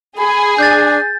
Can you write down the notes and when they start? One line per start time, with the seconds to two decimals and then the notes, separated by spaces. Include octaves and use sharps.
0.18 G#4 G#5 B5
0.58 D4 G6 A6